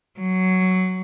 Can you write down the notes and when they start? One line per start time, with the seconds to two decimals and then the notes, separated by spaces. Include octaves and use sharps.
0.20 F#3